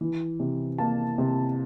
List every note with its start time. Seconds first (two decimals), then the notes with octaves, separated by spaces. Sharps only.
0.01 E3
0.40 C3
0.78 A#3 A5
1.18 C3